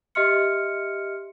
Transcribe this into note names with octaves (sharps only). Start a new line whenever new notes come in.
G4 D#5 E5 C6 F6 C#7